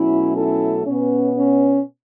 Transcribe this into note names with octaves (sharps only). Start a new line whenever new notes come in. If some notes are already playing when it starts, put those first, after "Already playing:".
Already playing: B2 F#3 A3 C#4 E4
E4 A4
B2 B3 C#4
C#4